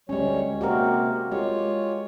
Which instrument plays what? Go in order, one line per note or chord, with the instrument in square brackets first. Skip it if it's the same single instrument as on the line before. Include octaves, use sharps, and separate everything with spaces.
[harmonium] D2 G3 C#5 [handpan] G#3 C#4
[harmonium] C3 A#3 C4 [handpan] F#4 G4 A#4
[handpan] G#3 G4 [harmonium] F4 C#5